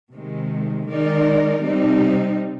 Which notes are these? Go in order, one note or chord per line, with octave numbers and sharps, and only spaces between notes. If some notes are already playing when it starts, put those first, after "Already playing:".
C3 D#3 G#3
D#3 G#3 D#4 A#4 D5
C3 G3 C4 D#4